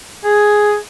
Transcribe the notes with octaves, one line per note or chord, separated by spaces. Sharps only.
G#4